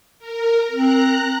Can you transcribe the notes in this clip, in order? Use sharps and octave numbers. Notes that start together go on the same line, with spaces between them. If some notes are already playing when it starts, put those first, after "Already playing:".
A#4
C4 A#5 F#6